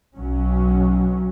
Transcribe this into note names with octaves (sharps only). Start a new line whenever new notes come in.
B1 F#3 C#4